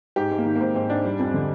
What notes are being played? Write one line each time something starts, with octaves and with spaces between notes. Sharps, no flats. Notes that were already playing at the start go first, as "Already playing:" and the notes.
G#2 G4
G#2
A#3
D#3
A#3
G#2 C4
G#2 C4
G#2 D4
G3
F2
D3